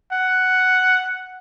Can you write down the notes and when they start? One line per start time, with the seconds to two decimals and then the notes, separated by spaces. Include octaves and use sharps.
0.12 F#5